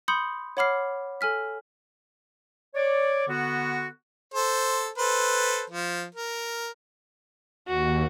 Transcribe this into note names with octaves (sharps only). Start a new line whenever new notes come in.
B5 C6 D#6 G6 C#7 F#7
C#5 F#5 B5 D6 F6 C7
A4 G#5 F6 B6
C#5 D5
D3 B3 F#4
A4 C5
A4 B4 C5
F3
A#4
D#2 F#4